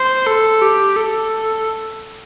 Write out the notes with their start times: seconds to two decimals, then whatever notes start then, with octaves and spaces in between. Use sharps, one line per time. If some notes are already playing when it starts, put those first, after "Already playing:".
Already playing: C5
0.26 A4
0.61 G4
0.96 A4